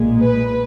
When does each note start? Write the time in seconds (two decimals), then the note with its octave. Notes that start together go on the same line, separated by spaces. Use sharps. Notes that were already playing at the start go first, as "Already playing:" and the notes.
Already playing: B1 A#2 G#3
0.20 B4